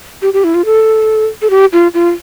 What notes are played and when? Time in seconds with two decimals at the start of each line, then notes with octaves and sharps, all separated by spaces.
0.22 G4
0.34 G4
0.44 E4
0.54 F4
0.66 A4
1.42 A4
1.50 G4
1.73 F4
1.94 F4